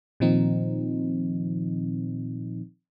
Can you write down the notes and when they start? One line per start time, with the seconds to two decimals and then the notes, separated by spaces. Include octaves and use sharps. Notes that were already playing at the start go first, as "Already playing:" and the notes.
0.20 A#2 D#3 F3 C4 D#4